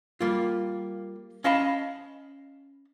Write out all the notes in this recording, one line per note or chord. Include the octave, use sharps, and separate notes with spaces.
G3 A#3 F4
C#4 D#5 F5 A5 B5